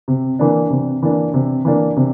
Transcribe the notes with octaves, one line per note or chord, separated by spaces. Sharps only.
C3
E3 A#3 D4
C3
E3 A#3 D4
C3
E3 A#3 D4
C3